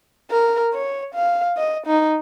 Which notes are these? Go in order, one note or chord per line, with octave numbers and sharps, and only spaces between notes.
A#4
C#5
F5
D#5
D#4